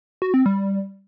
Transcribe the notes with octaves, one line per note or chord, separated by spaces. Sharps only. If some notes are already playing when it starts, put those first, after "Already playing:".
F#4
C4
G3